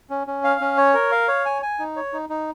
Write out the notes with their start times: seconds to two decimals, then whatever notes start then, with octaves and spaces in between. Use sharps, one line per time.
0.10 C#4
0.27 C#4
0.44 F5
0.61 C#4
0.77 C#5
0.94 A#4
1.12 F5
1.28 C#5
1.45 G#5
1.62 G#5
1.79 D#4
1.96 C#5
2.13 D#4
2.29 D#4